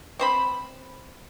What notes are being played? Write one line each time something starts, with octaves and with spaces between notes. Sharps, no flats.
C4 C5 B5